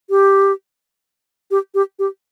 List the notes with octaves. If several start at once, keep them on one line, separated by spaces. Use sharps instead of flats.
G4
G4
G4
G4